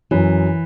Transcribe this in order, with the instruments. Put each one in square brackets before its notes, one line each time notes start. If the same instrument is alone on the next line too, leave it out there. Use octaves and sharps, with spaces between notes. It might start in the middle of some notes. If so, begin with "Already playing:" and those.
[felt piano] F#2 [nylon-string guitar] E3